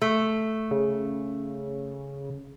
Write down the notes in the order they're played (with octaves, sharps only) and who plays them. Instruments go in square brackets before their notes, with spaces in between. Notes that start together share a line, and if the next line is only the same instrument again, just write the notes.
[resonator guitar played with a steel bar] A3
[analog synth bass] C#3